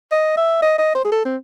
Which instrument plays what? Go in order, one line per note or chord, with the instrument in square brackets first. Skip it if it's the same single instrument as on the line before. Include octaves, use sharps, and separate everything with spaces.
[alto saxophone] D#5
E5
D#5
D#5
C5
G#4
A4
C4